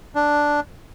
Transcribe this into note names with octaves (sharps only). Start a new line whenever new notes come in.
D4